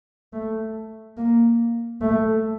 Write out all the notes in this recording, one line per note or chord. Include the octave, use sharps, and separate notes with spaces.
A3
A#3
A3